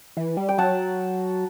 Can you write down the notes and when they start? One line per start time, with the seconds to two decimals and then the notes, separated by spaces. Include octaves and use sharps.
0.17 E3
0.37 G3
0.49 G5
0.58 F#3 F#5 A5